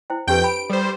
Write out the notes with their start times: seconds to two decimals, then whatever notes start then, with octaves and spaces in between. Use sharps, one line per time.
0.10 E4 C5 G5
0.27 F2 D4 G4 B4 G5 G6
0.44 B5 D7
0.70 G3 A4 C5